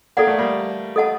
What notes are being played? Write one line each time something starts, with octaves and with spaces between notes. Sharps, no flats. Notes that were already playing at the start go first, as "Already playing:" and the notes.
A#3 A4 D5 F#5
A3
G3 A#3
A4 D#5 F#5 A5